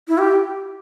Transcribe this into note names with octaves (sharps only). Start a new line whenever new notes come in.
E4
G4